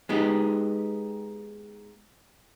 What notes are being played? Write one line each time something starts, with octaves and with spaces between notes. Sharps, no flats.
G#3 B3 D#4 G4